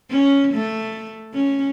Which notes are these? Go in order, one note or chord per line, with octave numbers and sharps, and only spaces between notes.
C#4
A3
C#4